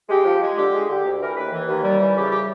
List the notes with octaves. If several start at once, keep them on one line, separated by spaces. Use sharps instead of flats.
G#3 G4
F3
G#3
D3 G4
G#3
D3 G4
D2
E3 A#4
D#2 B4
E3
D#2
G3
E3
C#3 G4
G4